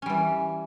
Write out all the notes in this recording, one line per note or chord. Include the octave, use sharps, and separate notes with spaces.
E3 G3 C#4